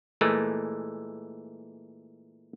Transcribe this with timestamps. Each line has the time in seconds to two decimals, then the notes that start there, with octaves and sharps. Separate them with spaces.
0.21 A#2 E3 G#3 A3